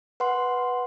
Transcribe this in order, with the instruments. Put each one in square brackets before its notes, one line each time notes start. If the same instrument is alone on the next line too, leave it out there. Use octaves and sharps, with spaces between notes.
[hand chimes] B4 F#5 C6